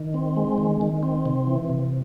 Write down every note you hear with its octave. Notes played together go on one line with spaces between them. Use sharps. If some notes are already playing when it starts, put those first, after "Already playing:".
Already playing: D#3
C4
G#3
D#3
D#3
C4
C3
E3
C3